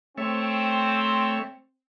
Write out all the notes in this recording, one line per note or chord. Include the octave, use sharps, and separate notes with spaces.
A3 C4 C#5 E5